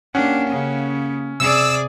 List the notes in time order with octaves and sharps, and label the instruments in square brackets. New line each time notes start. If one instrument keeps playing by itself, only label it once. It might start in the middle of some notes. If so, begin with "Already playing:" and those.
[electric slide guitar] A#3 G4 F#5 [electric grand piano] C#4 [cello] D4
[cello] C#3
[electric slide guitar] C3 [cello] G#4 D5 [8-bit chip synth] E6